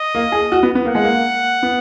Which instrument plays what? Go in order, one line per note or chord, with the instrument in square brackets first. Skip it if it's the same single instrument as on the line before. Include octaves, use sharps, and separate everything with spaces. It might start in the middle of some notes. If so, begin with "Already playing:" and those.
Already playing: [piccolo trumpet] D#5
[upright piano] A#3
G#4
F#4
B3
B3
[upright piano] A#3 [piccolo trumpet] F#5
[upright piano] G#3
A#3
B3